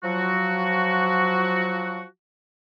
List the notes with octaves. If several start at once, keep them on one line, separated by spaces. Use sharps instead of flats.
F3 F#3 F#4